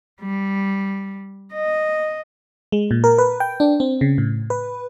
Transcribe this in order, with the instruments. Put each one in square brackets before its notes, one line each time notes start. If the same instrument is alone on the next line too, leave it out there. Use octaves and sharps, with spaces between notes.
[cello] G3
D#5
[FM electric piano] G#3
A#2
A#4
B4
G5
D4
C4
C#3
A2
B4